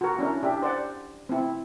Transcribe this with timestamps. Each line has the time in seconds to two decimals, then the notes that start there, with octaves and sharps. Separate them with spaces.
0.01 F#4 A#4
0.19 C#4 D4 E4 A#4
0.43 D4 G4 E5
0.62 C5 D5 F#5
1.29 C4 E4